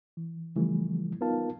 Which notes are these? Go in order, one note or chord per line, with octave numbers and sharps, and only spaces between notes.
E3
C#3 E3 F3 G3 A3
B3 D#4 F4 A#4 F5 A5